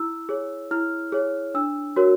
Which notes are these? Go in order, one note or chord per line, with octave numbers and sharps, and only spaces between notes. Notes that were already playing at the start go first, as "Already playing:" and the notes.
Already playing: E4 E6
G#4 C#5
E4 F6
G#4 C#5
D4 E6
F#4 A#4 C#5